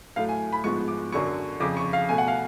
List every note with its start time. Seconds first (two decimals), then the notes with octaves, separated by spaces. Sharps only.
0.16 A2 F#3 A3 F5
0.29 G#5
0.52 B5
0.64 G#2 F3 G#3 B3 C#6
0.88 D6
1.12 F#2 D3 F#3 C#6
1.60 F2 C#3 F3 D6
1.77 C#6
1.93 F5
2.09 B2 A3 G#5
2.18 F#5
2.28 F5